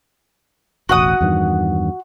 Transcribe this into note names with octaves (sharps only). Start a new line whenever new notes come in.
E1 A1 F#4 F#5 D#6
E2 G2 D#3